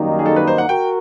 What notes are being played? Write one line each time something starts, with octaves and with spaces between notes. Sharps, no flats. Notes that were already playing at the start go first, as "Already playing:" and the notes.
Already playing: F#2 D#3 G3 A#3 D#4
G#4
A4
B4
C5
F#5
F#4 A#4 G5